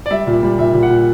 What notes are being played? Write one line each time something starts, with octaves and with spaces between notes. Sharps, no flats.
D5
G3 E5
A#2
G3
A#2 E5
A#2
F#5
A#2